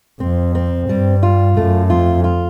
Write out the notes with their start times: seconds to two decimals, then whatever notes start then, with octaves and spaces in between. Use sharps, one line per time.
0.20 F2 C4
0.55 C4
0.89 G2 G3
1.23 F4
1.57 F#2 A3
1.90 F2 F4
2.24 F4